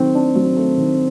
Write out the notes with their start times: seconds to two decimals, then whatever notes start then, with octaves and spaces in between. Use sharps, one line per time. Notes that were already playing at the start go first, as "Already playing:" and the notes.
Already playing: D#3 F#3 A3 C4
0.15 D4
0.35 F#3
0.57 A3
0.78 D#3